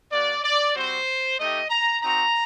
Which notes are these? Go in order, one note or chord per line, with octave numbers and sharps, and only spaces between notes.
A#3 F#4 D5
D5
G3 C4 F#4 C5
A3 D#4 G4 D#5
A#5
C4 D#4 F#4 A#5